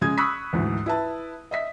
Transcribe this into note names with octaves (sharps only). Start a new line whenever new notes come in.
C#3 G#3 D#6 G#6
B5 C#6 D#6 E6 F#6 B6
D2 G#2 E3
E4 B4 A5
D#5 E5 B6